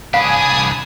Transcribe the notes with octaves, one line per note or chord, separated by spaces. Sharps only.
C2 D4 F5 G#5 B5 D#6